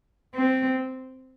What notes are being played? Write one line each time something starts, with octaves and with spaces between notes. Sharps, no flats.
C4